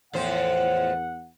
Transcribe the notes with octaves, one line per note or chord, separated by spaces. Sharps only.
E2 A2 F3 C5 F#5